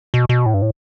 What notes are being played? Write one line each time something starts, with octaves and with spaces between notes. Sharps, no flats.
B2
B2
A2
G2
A2